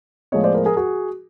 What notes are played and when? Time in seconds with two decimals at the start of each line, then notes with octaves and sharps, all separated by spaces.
0.32 A2 F3 G#3 B3 C#5 D#5
0.44 C5 D5
0.54 A#4 C5
0.66 G#4 A#4
0.77 F#4 G#4